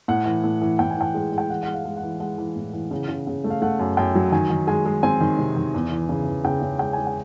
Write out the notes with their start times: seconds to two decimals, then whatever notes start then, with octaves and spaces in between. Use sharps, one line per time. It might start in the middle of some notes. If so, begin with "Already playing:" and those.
0.08 A2 F#5
0.26 E3
0.44 A2
0.62 E3
0.79 A2 G5
0.91 G#5
0.96 E3 G5
1.14 G#3
1.32 G#3
1.38 G5
1.50 E3 F#5
1.63 G#3 F#5
1.74 F5
1.85 G#3
1.97 F#5
2.03 E3
2.20 G#3 F#5
2.38 E3
2.56 A2
2.73 E3
2.91 C#3
3.09 C#3
3.27 C#3
3.44 A3
3.50 F5
3.62 A3 F#5
3.79 F#2
3.97 F#2 G5
4.15 F#3
4.32 D#3 G#5
4.50 D#3
4.67 G#3 G#5
4.86 G#3
5.03 C4 G#5
5.21 D#3
5.39 C3
5.56 D#3
5.74 E2
5.92 E3
6.09 C#3
6.27 E3
6.44 C#3 G5
6.62 C#3
6.79 G#3 G5
6.93 G#3 G#5
7.07 G5